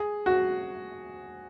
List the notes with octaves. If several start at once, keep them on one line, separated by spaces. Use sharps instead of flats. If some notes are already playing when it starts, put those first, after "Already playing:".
Already playing: G#4
F#4